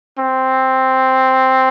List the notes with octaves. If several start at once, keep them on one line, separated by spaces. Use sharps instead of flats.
C4